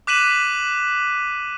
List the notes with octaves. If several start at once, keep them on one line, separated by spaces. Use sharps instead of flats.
D6 F#6 B6 D#7 E7 F#7